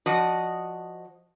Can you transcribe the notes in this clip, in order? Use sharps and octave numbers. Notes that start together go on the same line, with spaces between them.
F3 F#4 D5 D#5